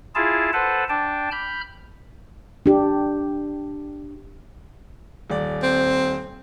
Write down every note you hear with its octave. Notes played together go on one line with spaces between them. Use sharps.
E4 F4 G#4 A5
A4 B4 C5 F#5 A5
D4 G5 A5
B5 F6 G6
D4 G4
D#1 D5
C4